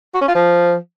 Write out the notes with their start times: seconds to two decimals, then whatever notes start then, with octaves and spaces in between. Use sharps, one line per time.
0.14 F#4
0.21 C#4
0.28 F4
0.35 F3